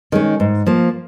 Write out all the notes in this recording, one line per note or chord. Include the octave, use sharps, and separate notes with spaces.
D#3 G#3 C#4
G#2
F3 A#3